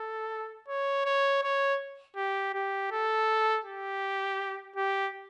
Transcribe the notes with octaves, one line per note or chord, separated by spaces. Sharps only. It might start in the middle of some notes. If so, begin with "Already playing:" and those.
Already playing: A4
C#5
C#5
C#5
G4
G4
A4
G4
G4